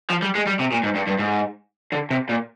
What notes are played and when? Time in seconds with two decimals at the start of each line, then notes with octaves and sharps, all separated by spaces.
0.10 F3
0.23 G3
0.35 G#3
0.47 G3
0.59 C3
0.72 A#2
0.83 G#2
0.95 G2
1.08 G2
1.19 G#2
1.92 D3
2.11 C3
2.29 A#2